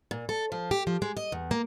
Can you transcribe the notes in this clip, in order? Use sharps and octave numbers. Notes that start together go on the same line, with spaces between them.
A#2
A4
F3
G4
F3
G#3
D#5
E2
A#3